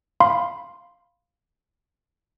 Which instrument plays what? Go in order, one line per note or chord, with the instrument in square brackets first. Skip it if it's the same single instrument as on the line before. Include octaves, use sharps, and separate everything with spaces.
[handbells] F5 B5 C6